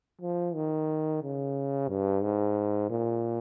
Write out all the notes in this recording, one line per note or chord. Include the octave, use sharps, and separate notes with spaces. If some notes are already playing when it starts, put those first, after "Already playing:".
F3
D#3
C#3
G2
G#2
A#2